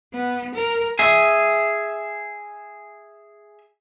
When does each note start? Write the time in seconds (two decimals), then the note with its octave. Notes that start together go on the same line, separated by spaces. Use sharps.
0.14 B3
0.54 A#4
0.99 G#4 E5